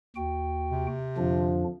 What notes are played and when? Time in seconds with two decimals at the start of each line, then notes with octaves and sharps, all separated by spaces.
0.16 D#2 F#4 G5
0.70 C3
1.17 F2 D3 F3 D4